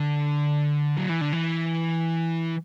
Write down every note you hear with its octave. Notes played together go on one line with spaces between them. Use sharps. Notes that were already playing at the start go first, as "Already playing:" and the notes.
Already playing: D3
F#3
E3
D3
E3